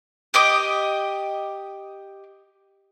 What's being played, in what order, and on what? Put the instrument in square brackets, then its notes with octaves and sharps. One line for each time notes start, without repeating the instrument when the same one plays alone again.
[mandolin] G4 D#5 D6